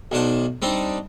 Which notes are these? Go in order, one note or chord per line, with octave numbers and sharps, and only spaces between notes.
B1 D#3 D4 C5 F#5
G3 C4 D4 D#4